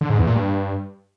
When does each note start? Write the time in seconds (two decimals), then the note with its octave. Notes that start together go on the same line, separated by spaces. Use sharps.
0.01 D3
0.10 G#2
0.18 E2
0.27 A#2
0.36 G2